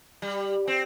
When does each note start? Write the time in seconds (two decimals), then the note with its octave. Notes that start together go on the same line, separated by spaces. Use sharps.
0.22 G3
0.67 C4